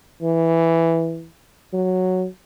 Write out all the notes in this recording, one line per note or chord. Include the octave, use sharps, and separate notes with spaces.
E3
F#3